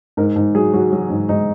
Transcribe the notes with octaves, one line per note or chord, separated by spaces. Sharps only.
G#2 A#4
G#2
F#3 G#4
F#3 F#4
F#3
G#2
G#2 D#4